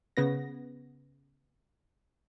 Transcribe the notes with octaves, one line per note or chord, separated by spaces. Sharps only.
C#3 B3 A#6